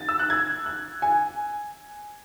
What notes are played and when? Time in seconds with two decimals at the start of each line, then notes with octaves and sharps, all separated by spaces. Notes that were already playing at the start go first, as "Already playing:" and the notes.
Already playing: A6
0.09 E6
0.19 F#6
0.30 G#6
0.66 F#6
1.02 G#5